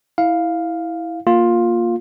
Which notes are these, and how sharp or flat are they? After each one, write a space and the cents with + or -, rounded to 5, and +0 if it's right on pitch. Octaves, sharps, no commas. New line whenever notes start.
E4 -10 F5 +5
A#3 +0 F4 +10